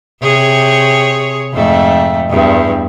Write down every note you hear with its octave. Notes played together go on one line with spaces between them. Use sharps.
C3 G#4 C#5
F2 G#2 A3
E2 G2